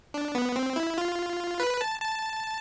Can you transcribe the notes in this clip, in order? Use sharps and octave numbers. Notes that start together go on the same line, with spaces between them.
D4
B3
C4
E4
F4
B4
A5
A5